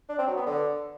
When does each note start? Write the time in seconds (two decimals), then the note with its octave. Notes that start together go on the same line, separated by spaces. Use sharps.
0.09 D4
0.18 C4
0.27 F#3
0.37 B3
0.46 D3